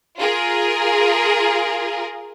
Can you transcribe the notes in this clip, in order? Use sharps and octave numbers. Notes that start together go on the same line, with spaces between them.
F4 G#4 A#4